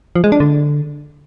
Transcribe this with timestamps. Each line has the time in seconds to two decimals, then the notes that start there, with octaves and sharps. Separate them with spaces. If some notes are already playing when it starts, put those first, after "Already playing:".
0.16 F3
0.24 G#3
0.32 D4
0.40 D3